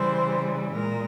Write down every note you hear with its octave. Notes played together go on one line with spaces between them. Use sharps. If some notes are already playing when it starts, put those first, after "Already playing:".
Already playing: C#3 E3 G3 C5
A#2 G#3 A#4